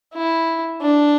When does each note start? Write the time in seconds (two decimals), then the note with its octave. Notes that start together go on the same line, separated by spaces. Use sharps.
0.14 E4
0.81 D4